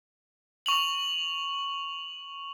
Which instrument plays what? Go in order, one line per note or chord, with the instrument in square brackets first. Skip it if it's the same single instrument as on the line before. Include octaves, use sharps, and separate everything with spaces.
[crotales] C#6 F7 F#7